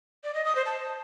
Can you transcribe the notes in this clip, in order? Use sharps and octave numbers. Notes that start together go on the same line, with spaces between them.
D5
D#5
D#6
C5
A5